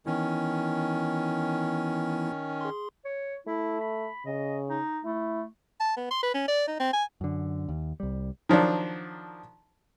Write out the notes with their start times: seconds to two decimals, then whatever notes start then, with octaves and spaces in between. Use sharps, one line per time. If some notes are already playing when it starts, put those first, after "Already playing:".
0.06 D#3 E3 B3 C#4 E4
2.61 G#4 C6
3.05 C#5
3.47 A3 E4
3.81 B5
4.26 C#3 D#5
4.70 D#4
5.05 A3 E4
5.80 A5
5.97 B3
6.11 C6
6.23 B4
6.34 C#4
6.48 D5
6.68 D#4
6.80 C4
6.93 G#5
7.21 F#2 D3
7.69 D#2
8.00 C2 G3
8.49 D#3 F3 F#3 D4